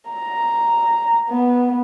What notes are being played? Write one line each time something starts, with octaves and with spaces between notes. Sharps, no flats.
A#5
B3